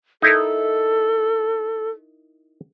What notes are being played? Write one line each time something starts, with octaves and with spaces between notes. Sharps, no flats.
D#4 E4 A4 A#4